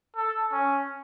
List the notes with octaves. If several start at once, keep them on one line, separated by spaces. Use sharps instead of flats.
A4
C#4